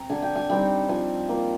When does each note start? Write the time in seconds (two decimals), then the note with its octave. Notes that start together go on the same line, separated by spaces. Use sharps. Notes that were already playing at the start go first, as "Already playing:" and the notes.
Already playing: C4 A#5
0.10 D3 G#5
0.22 G5
0.36 G#5
0.50 G3 C4 D#4 G5
0.89 F3 G#5
1.29 A#3 F4